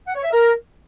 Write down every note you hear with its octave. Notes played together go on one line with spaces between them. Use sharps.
F#5
C#5
E5
A#4